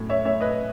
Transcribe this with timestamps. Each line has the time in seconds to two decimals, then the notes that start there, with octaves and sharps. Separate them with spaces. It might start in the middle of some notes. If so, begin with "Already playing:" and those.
Already playing: F#2 A2
0.09 C#5 E5
0.25 A2 C#5 E5
0.41 B4 D#5